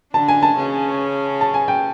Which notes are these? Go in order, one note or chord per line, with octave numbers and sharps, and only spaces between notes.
D3 D4 A5
G#5
A5
C#3 C#4
A5
G#5
G5